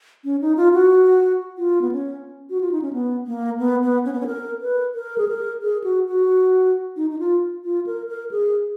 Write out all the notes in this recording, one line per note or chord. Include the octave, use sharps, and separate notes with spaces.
C#4
D#4
F4
F#4
F4
B3
C#4
F#4
F4
D#4
C#4
B3
A#3
B3
B3
C#4
B3
C#4
A#4
B4
A#4
G#4
A#4
G#4
F#4
F#4
D#4
D#4
F4
F4
A#4
A#4
G#4